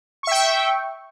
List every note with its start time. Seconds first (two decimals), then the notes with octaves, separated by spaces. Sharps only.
0.23 C#6
0.27 E5
0.31 G5